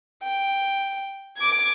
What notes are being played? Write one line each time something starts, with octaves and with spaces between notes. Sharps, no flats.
G5
D6 G#6